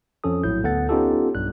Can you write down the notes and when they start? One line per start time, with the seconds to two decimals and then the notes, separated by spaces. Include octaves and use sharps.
0.24 F2 F3 C#4 A4 D#6
0.44 A#1 A2 F#3 E4 G6
0.63 D2 B3 A4 F#5 A6
0.89 B3 C#4 D#4 F4 G4 A4
1.35 B1 G2 G3 F#6